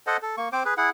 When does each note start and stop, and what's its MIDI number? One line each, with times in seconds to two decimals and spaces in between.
0.07 0.17 69
0.07 0.17 72
0.07 0.17 75
0.07 0.17 78
0.22 0.36 69
0.37 0.49 58
0.37 0.49 85
0.53 0.63 60
0.53 0.63 72
0.53 0.63 86
0.65 0.74 68
0.65 0.74 71
0.77 0.90 64
0.77 0.90 68
0.77 0.90 78